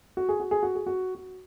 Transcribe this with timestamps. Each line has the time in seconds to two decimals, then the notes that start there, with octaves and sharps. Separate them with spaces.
0.17 F#4
0.29 G#4
0.40 F#4
0.51 G#4
0.63 F#4
0.75 G#4
0.86 F#4
1.15 F#4